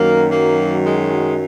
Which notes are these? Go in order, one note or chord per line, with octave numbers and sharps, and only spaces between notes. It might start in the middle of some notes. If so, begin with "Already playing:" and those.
Already playing: F#2 D#3 F#3 A#3
A#3
G#3